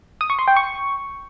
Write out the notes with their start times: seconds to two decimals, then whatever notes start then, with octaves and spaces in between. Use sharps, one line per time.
0.21 D#6
0.30 C#6
0.39 C6
0.48 G5
0.56 C#6